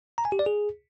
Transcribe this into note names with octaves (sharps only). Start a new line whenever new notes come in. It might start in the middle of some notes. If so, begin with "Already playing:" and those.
A#5
G#5
G4
D5
G#4